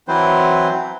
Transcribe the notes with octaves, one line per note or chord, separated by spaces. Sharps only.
E3 F#3 C4 E4 B4 C5